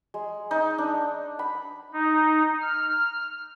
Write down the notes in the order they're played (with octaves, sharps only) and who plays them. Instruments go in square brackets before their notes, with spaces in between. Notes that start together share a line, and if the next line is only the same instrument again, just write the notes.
[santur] G#3
D#4
D4
B5
[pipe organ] D#4
F6